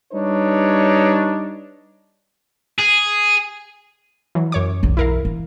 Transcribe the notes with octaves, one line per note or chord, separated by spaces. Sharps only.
G3 D4 D#4 B4 C#5
G#4
E3 F#3
F#2 C#5 D6
B1 E2
E4 A#4 F5
E3